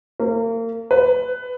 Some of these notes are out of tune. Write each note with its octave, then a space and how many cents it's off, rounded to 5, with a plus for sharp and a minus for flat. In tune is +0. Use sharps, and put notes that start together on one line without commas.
A#3 -35
B4 +15